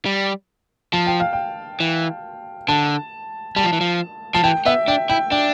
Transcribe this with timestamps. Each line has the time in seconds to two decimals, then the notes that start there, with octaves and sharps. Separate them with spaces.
0.06 G3
0.93 F3 A5
1.07 G5
1.20 F5
1.33 G5
1.80 E3
2.68 D3 A5
3.56 G3 A5
3.64 F3
3.73 E3
3.81 F3
4.34 F3 A5
4.44 E3 G5
4.65 B3 E5
4.88 D4 G5
5.10 E4 G5
5.31 D4 G5